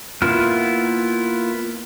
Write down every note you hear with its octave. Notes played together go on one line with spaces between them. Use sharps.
A#3 B3 E4 F4 F6